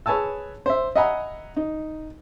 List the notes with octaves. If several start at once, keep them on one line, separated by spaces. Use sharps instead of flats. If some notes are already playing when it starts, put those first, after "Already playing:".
G#4 B4 C#5 G#5 A5 E6
C5 E5
D#5 E5 F#5 G#5 A#5 B5
D#4